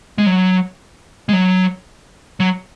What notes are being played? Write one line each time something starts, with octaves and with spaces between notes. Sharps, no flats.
G#3
F#3
G#3
F#3
F#3